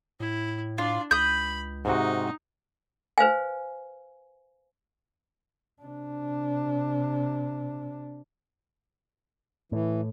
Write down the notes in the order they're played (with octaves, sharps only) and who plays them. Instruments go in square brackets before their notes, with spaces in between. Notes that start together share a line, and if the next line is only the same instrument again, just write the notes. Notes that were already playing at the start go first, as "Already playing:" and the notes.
[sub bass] A2 [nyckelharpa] E4
[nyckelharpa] D4 D5 [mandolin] F4
[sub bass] C#2 [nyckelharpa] B5 [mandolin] D#6 G6
[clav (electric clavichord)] G#2 C3 F#4 [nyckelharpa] D#4
[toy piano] B4 C5 F5 G#5
[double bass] C3 D4
[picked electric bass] A2 [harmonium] E3